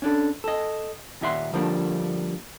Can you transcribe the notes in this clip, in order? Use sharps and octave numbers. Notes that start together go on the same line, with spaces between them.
C#4 D4 A4
A4 D#5
D#2 A#2 D#4 E5 F#5 C6
D3 F3 G3 A#3 D4